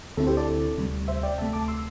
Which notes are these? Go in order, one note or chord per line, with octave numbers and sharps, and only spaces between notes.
D2 D3 C4 E4 A4
G4 C5
A4 D5
D2 C3 G3
C5 E5
D5 G5
D2 C3 A3 E5 A5
A5 D6
C6 E6